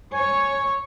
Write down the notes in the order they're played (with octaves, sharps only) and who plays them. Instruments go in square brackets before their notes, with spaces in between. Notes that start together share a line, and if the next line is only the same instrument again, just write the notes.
[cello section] C#5 [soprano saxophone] G#5